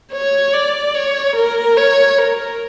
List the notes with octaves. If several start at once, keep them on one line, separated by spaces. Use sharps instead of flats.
C#5
D5
C#5
A#4
C#5
A#4